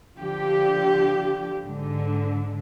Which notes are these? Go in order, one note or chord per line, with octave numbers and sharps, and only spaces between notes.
D3 F3 G4
G#2 D3